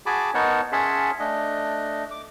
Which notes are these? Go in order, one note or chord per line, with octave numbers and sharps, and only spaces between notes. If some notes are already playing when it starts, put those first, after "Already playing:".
F#4 G#4 G#5 A5 B5 D6
B3 D#4 A#4 C#5 F#5 A5
C#4 G#4 E5 F#5 A5 C6
A3 D4 D#5
D6